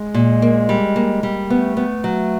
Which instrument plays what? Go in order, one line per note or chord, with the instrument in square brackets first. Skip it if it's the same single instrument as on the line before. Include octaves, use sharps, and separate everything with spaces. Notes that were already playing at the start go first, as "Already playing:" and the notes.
Already playing: [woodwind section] G#3
[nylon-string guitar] A#2
A#3
G3
A#3
G3
[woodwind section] A3 [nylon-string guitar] B3
[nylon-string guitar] B3
F#3